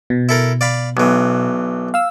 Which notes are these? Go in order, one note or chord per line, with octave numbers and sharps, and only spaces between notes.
B2
E4 A4 A#4
D5 F5 B5
B1 E3
F5 E6